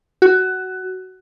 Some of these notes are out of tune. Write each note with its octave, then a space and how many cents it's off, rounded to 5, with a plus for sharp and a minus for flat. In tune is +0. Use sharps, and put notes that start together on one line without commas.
F#4 +15